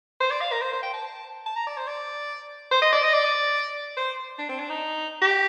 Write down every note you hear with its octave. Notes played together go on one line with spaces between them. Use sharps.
C5
D5
F5
A#4
C5
C5
G5
A5
A5
A#5
D5
C5
D5
C5
D#5
D5
D#5
D5
C5
D4
C4
D4
D#4
G4